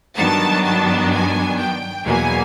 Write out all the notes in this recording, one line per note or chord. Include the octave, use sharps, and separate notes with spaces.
G2 D#3 F#3 B3 D4 A5
A5
G#5
G5
E2 B2 F#3 A#3 G#5